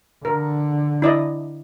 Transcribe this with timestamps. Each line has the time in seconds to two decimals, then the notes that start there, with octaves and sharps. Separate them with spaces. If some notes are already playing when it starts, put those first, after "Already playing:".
0.25 D3 A#4
1.02 E4 D5 D#5